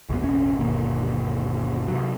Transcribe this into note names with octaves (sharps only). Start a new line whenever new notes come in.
C#2 F#2 B3
E1 A1 C4 C#4
G1 D#2 B2 A#3
C3 F#3